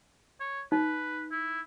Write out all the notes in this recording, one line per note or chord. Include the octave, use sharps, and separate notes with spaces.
C#5
D#4 B4
E4